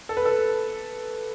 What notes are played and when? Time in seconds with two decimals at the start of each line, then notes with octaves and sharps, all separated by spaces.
0.09 A4
0.17 B4
0.25 A4